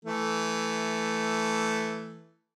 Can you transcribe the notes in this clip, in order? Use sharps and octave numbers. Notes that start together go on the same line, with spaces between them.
E3 A3